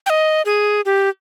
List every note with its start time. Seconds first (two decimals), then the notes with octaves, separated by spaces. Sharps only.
0.06 G5
0.10 D#5
0.45 G#4
0.86 G4